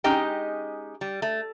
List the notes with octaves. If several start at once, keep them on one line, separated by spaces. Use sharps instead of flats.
G#3 C#4 D#4 G4 D#5 G5
G3
A3